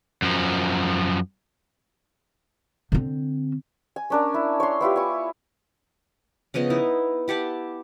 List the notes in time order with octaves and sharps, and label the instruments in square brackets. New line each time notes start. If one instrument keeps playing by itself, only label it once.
[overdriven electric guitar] F#2 F3
[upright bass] D3 C4
[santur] G#5
C#4 D4 A#4
E4
C#5 C6
B3 E4 F4 G4
G#5 C#6
[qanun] C#3 F3 B3 D#5
D#4 E4
E4 G4 F#5 A5